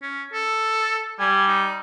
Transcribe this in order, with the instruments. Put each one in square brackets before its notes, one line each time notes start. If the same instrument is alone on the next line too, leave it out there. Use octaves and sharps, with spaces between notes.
[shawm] C#4
A4
[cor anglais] G3 [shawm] G#5
[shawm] D#4